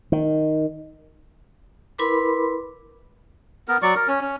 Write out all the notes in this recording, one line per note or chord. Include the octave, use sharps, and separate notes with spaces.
D#3
E4 A#4 B4 B5 C6 D6
B3 A#4
F#3 D5 C#6
A#4
C#4
C#4